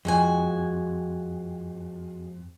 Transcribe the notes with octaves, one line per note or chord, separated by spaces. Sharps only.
F2 G#3 F#4 G#5